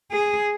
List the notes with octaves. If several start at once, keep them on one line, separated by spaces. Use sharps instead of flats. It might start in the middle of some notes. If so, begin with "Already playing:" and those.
G#4